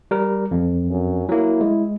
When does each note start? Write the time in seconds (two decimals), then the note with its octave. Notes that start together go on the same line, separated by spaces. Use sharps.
0.11 G3 A#4
0.51 F2
0.89 F#2
1.29 F#3 A#3 E4
1.61 G#3